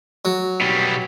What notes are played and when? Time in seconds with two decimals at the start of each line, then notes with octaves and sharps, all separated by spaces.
0.25 F#3
0.61 B2 G3